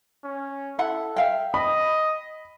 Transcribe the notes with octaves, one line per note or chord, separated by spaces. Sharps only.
C#4
E4 A4 F#5 B5
E5 F5 G5
D#5 B5